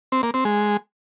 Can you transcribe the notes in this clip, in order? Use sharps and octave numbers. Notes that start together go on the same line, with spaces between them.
C4
A#3
C4
G#3